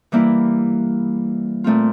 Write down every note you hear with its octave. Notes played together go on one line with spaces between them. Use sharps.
E3 G3 A#3 E4
A#2 A3 C4 F4